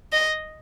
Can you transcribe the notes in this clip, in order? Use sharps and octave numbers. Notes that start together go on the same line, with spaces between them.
D#5